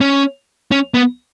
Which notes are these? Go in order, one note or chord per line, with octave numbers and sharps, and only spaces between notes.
C#4
C#4
B3